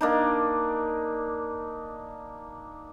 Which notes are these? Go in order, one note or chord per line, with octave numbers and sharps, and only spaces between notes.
A#3 D4 D#4